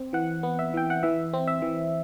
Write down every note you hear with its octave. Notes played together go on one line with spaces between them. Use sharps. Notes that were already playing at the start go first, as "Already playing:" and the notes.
Already playing: C4
E3 F#5
B3
E5
E3 G5
F#5
E3 E5
C4
E5
E3